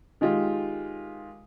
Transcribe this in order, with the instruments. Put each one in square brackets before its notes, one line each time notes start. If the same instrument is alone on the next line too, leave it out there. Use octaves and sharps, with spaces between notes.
[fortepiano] D#3 G#3 F4 G4